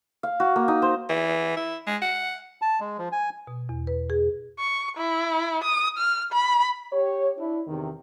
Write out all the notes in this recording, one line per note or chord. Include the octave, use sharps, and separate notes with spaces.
F5
F#4
A#3
D#4
C5
E3
E4
G#3
F#5
A5
G#3
F3
G#5
B2
E2
B4
G#4
C#6
E4
D#6
F6
B5
G4 C#5
D4 E4
E2 C3 D#3